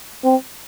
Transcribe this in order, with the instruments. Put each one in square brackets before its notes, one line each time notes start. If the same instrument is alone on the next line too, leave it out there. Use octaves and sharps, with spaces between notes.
[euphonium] C4